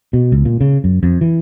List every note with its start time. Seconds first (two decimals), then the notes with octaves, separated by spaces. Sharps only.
0.13 B2
0.32 C#2
0.45 A#2
0.61 C#3
0.84 F#2
1.03 F2
1.21 E3